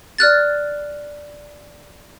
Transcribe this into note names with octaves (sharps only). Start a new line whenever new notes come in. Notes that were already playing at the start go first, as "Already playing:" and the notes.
D5 F6 F#6 A6